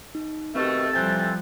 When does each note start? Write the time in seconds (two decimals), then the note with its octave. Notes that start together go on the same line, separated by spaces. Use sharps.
0.15 D#4
0.55 B2 D#3 A3 C4 G4 A4
0.93 C3 E3 F3 G3 C4 F#6 G6 A6